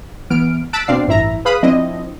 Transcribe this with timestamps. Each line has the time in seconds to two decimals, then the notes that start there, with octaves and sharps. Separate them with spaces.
0.30 E3 B3 F6 D7
0.73 A5 E6 F#6 A6 B6 D7
0.88 B2 C4 D4 D5 F5 C7
1.07 A1 G2 E4 E5 A#5
1.45 G#4 B4 F5 B5 D#6 F#6
1.63 F3 C4 D4 E4 D#5